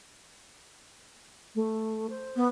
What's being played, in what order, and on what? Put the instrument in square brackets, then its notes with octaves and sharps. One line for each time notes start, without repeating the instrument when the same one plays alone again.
[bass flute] A3
C5
[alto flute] B3